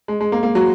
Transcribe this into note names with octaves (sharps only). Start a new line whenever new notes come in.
G#3
G#3
A#3
A#3
F#3 F#4